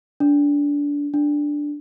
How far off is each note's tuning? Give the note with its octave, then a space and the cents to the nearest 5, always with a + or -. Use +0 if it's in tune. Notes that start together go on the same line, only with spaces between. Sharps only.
D4 -25
D4 +0